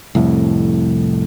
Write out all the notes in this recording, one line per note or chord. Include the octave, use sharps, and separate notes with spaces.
C2 F2 A2